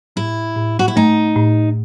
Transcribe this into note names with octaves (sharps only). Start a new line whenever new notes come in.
A2 E4
A2
F#4
E4
A3 D#4
A2